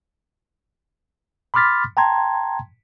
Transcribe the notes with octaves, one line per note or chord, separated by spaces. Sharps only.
B5 C6 D6 F6 A6 B6
G5 A5 A#5 C6 G#6